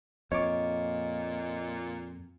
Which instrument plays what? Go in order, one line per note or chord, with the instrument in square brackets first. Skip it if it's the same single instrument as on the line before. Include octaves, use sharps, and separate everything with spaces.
[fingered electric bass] F2 [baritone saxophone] A#2 [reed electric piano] C#5 D6 [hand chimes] D#5